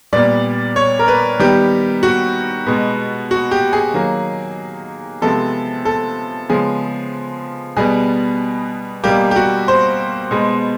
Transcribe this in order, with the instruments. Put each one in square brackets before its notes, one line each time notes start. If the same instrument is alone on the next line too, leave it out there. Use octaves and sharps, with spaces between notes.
[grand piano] A#2 G3 B3 D5
C#5
A#4
B4
D#3 G3 B3 G4
F#4
B2 G#3 B3
F#4
G4
G#4
D#3 F#3 A#3
C3 F3 G#3 B3 A4
A4
C#3 F3 G#3 B3 G#4
B2 G3 B3 G#4
B2 G3 A#3 G4
G4
F#4
C5
B2 G#3 B3